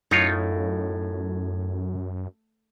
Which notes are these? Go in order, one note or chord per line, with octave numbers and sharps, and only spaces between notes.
F#2 A2 D#4 F4 C#5